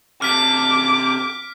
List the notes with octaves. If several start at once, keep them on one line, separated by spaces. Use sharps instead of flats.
C3 D4 D6 F6 B6